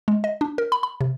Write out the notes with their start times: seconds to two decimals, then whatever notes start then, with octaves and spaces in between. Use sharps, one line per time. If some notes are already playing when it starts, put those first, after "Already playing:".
0.08 G#3
0.24 D#5
0.41 D4
0.58 A#4
0.72 B5
0.83 B5
1.01 C3